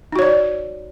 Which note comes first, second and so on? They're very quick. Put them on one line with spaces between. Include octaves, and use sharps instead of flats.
D#4 F#4 C#5 D5